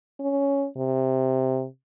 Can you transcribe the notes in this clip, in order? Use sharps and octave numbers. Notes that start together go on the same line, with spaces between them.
C#4
C3